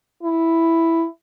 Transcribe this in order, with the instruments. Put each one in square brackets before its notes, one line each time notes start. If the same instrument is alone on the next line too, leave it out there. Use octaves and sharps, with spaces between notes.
[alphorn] E4